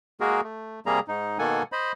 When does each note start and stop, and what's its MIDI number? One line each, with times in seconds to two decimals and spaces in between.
0.20 0.41 56
0.20 0.41 58
0.20 0.41 66
0.20 0.41 68
0.20 0.41 70
0.43 0.80 57
0.86 0.99 48
0.86 0.99 55
0.86 0.99 58
0.86 0.99 68
0.86 0.99 82
1.08 1.38 44
1.08 1.38 63
1.39 1.63 47
1.39 1.63 51
1.39 1.63 58
1.39 1.63 69
1.39 1.63 78
1.39 1.63 80
1.72 1.92 72
1.72 1.92 75
1.72 1.92 83